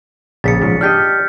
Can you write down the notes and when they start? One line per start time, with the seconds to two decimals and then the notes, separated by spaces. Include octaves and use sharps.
0.44 A#1 C#3 A#3 A6 B6 C#7
0.62 G#2 C#3 F3
0.81 D4 G4 D#5 F6 G6 B6